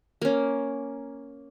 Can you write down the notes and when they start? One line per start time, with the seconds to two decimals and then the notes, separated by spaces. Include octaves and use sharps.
0.22 A#3 C#4